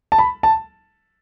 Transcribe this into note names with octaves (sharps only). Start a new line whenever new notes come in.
A5
B5
A5